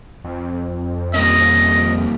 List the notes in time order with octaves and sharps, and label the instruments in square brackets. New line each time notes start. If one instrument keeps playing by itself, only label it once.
[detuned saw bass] F2
[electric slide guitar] G3 A#3 C#4 [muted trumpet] D#5